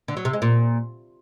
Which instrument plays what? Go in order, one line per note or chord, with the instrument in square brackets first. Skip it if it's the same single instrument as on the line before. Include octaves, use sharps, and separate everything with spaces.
[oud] D3
F#3
C3
G#3
A#2